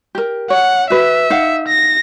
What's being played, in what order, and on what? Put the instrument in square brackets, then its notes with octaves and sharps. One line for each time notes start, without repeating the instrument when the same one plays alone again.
[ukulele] G4 A#4
[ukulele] C#5 [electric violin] F#5
[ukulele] F#4 B4 [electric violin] E5
[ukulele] D#4 F5 F#5
[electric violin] A#6